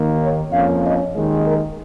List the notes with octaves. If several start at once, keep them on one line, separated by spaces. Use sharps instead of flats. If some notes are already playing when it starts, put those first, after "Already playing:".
Already playing: D#2 D#3 A#3
C#5
F2 F3 A#3 C#4 F5
D#5
D#2 D#3 G#3
A#4